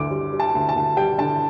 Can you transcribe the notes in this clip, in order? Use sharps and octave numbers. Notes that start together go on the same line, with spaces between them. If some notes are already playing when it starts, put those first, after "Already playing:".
Already playing: D2 D3 D6
G3
G3
A5
D2
A5
D2
G3 G5
D3 A5